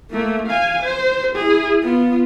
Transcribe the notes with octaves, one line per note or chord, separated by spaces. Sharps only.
A3 A#3
F5 G#5
C5
E4 G#4
B3 F4